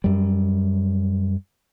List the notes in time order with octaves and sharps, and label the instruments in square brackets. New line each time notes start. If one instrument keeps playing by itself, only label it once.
[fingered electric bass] F#2 G3